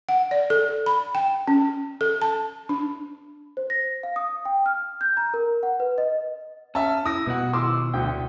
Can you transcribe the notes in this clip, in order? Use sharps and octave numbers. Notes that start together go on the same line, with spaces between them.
F#5
D5
A4
B5
G5
C#4
A4
A5
D4
C5
A#6
F5
D#6
G5
F6
G6
A#5
A#4
F#5
B4
D#5
C#4 E5 A5
E4 D#6 A#6
B2 G3 F#4 F#5
D#3 F3 E4 C6 D6 E6
D2 A3 G5